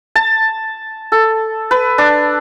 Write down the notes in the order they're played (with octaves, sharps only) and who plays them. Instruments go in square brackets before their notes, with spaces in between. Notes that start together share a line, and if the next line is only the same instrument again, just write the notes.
[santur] A5
A4
B4
D4